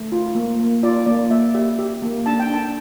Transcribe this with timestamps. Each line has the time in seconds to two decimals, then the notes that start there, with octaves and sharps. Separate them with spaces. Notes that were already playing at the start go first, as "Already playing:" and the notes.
Already playing: A3
0.12 F4
0.35 A#3
0.59 A#3
0.83 F4 D5
1.06 A#3 D5
1.31 A#3 E5
1.55 G4 E5
1.79 G4
2.02 A#3
2.26 D4 A5
2.40 G5
2.50 D4 A5